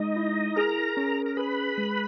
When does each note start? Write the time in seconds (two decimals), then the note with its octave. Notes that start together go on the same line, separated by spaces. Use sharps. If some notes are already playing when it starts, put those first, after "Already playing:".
Already playing: G#3 D#4 D#5
0.16 E4
0.56 G#4 A#4 A#5
0.97 C#4
1.26 A#5
1.37 G#4 B4 B5
1.78 G#3